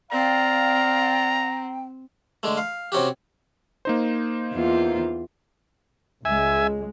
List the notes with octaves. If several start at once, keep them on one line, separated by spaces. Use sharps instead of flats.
C4 D5 F5 G5 A#5
D3 G#3 A3
F5
C3 C#4 F#4 G4
A#3 D#4 C5
E2 F4
C#2 G#3 E5 G#5